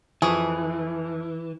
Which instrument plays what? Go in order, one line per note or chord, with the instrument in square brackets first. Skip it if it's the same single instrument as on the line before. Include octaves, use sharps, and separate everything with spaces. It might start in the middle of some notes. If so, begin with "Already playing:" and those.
[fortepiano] F2 F3 C#6 [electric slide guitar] E3 [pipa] G#4